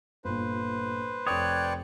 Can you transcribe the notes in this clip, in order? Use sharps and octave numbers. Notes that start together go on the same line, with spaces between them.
G1 A#2 B4 C5
F1 C#5 D5 G5 D#6 F#6